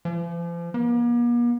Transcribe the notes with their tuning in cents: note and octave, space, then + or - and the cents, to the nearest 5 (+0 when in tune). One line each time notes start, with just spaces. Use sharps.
F3 -40
A#3 +45